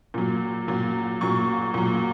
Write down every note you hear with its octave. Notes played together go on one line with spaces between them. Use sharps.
A#2 F#3
A#2 F#3
A#2 F#3 C#6
A#2 F#3